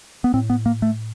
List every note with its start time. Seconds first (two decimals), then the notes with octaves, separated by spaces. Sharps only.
0.24 B3
0.34 A2 C4
0.50 B3
0.66 A#3
0.82 A3